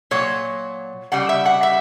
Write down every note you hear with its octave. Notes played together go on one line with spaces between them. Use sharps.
A#2 F#3 C#5
C#3 G3 F#5
E5
F#5
E5